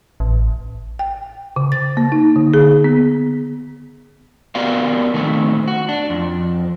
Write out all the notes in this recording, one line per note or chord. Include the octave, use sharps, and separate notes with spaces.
A1
G5
C#3
A6
A#3
D#4
D3
G#4
B3
B3 F#4 G4 A#4 D5 F5
D#3 A3 C4
F#4
D4
F2